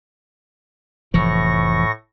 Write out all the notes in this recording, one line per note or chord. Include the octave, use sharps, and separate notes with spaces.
F1 A2 E3 F3 C#6 A#6